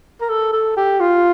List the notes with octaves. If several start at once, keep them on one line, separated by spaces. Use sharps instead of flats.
A#4
A4
A4
G4
F4